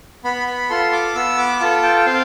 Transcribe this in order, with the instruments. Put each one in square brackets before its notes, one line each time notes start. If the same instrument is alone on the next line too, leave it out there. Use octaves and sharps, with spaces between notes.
[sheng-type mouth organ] B3 B5
B5
F4 A4 C6
D6
B3 E6
D6
F4 A4 A5
G5
G5
C4 F5